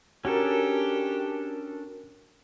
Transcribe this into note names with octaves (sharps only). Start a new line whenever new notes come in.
C#4 D4 F#4 G4 A4 A#4